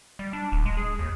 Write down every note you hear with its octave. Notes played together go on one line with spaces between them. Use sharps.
G3
D4
D1
G#3
G#4
D#2